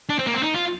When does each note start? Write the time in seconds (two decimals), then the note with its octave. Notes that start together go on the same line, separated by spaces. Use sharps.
0.09 D4
0.19 C4
0.27 A#3
0.34 C4
0.43 D#4
0.55 F4